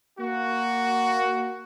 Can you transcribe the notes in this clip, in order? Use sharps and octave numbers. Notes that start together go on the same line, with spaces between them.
A#3 F#4